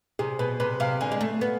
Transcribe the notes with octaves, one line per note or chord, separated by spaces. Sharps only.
C3 G#4
B2 B4
C3 B4
C3 F5
D3 G#5
G#3
A3
B3